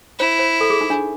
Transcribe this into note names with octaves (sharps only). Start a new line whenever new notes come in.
E4 C5
C5
A4
G#4
D#4
D4